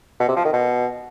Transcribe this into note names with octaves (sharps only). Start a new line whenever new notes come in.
B2
C3
F3
D#3
B2